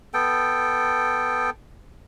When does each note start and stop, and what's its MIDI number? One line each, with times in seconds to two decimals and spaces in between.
0.14 1.50 59
0.14 1.50 69
0.14 1.50 79